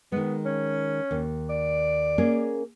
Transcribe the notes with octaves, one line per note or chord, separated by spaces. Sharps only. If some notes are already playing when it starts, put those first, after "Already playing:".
D#3 G#3 B3
C#4
D#2
D5
A#3 C#4 G#4